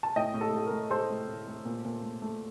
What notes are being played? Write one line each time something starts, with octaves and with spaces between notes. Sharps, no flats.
A5
A2 D#5 G5
A2
A4
A3 A4
A#4
A3
A2 A4 C5
A3
A2
A3
A#2
A#2
A3
A3